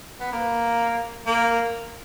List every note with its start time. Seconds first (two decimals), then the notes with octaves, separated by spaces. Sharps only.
0.20 B3
0.32 A#3
1.27 A#3